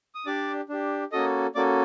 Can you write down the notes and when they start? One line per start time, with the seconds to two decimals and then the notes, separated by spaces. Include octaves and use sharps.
0.15 D#6
0.26 D4 G4 D5 D6
0.69 D4 G4
1.12 A#3 C#4 F#4 A4 D#5 D#6
1.55 A#3 C#4 F#4 A4 D5 D6